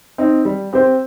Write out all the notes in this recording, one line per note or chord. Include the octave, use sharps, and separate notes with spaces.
C4 D#4
G3
C4 G4 C5